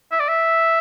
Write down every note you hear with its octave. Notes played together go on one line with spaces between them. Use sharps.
E5
D5
E5